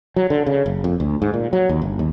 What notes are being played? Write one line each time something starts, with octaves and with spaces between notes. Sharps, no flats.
F#3
D3
C#3
F#1
F2
D2
G#2
A#2
F#3
D#2
G1
D#2